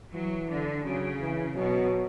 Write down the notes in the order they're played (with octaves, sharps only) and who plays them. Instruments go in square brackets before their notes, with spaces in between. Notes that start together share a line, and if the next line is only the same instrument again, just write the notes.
[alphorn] E3 [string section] F#3
[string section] D3
[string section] C#3 [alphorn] F#3
[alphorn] E3
[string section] B2 [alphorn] F#3